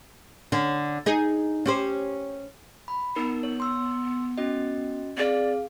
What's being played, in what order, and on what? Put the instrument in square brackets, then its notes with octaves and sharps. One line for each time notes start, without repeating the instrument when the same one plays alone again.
[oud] D3 C#4
D#4 G#4
C#4 G4 C5
[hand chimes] B5
[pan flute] B3 [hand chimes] D#4 A#4
[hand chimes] C#5
C6 E6
C#4 F#4 D#5
[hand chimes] C4 G#4 F5 [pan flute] D5